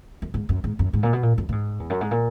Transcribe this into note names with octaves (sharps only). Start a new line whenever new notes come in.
F#2
G#2
F#2
G#2
F#2
G#2
A#2
B2
A#2
F#2
A#2
G#2
E2
F#2
G#2
A#2